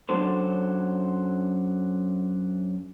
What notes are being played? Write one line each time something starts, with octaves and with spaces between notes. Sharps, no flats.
F#2 F#3 D4 A4 C5